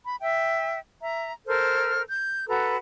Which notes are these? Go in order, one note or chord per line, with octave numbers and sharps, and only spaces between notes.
B5
E5 G5
E5 A#5
A4 A#4 C5 F6
G6
F#4 A4 B4 A#5